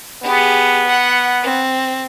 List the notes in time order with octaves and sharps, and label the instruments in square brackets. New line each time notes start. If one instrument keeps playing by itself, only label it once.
[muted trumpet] B3 [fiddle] G4 G#4
[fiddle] F#5
C4